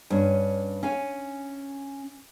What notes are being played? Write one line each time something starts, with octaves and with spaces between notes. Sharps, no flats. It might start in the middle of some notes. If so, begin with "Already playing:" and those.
G2 C#4
C#4 F5 G#5